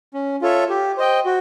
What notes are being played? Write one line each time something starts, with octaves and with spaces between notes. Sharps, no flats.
C#4
F4 A4 C#5 E5
G4
C5 D#5 G5
F#4